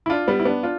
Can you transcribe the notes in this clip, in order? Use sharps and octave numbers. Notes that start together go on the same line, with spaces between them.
E4
D4 F4
G3 B3
E4
B3 D4
D4 F4